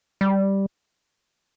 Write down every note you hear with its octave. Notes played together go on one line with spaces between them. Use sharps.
G3